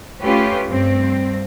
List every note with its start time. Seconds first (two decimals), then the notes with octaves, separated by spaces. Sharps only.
0.22 A3 C#4 F4 G4 B4
0.68 G2 C4